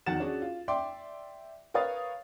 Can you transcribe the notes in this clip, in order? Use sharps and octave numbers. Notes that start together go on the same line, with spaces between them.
E2 D#3 F#3 F#5 A6 E7
C#4 D4 F#4 G#4 C#5
F4
D5 E5 G5 C6 D6
A#4 B4 C#5 F5 D#6 A6